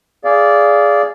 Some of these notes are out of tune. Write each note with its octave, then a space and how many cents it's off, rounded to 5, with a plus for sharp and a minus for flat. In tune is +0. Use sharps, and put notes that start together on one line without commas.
G#4 +0 D5 -15 F5 -15